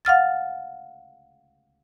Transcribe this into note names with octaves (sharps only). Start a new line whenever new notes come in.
F5 F#5 F6 A6